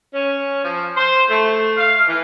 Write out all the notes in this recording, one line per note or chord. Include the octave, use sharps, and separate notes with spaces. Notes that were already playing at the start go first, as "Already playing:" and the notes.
C#4
F3
C5
A3
F5
E3